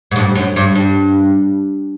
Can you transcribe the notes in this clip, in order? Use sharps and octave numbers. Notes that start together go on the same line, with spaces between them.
G#2
G2
F#2
G2
G2